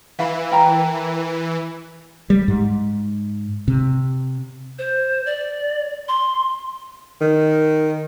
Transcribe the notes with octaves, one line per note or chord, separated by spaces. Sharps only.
E3 E5 F5 B5
A#4 G5 A#5
G3
G#2
C3
C5
D5
C6
D#3